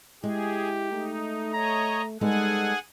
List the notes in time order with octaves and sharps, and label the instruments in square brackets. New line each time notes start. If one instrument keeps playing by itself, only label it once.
[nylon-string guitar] G#3 [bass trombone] E4 [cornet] G4 [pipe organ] G#4
[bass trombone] A3 [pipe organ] D#4
[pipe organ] C#5 D#5 [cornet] A#5
[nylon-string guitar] G3 G#3 B3 [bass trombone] D#4 [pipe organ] G#4 F#5 G#5 [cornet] A4